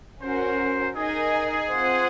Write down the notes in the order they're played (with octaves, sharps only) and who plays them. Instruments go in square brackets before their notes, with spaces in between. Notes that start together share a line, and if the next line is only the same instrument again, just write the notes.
[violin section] C#4 F#4 A#4 [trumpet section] C5
[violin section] D#4 A#4 D#5 G#5 [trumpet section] G#4
[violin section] C4 F4 C5 F#5